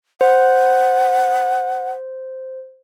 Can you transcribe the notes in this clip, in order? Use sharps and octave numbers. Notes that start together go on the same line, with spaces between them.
C5 F#5